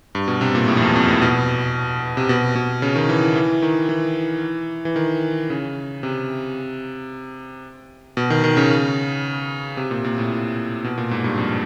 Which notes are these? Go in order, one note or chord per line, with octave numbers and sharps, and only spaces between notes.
G2
B2
C3
A#2
A2
F2
E2
F2
A2
B2
C3
B2
B2
C#3
D#3
E3
E3
D#3
E3
E3
D#3
C#3
C3
B2
D#3
D#3
C#3
C3
A#2
A#2
A2
B2
A#2
G#2
G2
F2